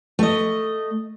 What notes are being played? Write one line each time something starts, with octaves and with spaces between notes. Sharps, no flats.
A3 D#5